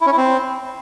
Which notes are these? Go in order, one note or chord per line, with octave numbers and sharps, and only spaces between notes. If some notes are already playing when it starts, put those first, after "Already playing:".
E4
C#4
E4
C4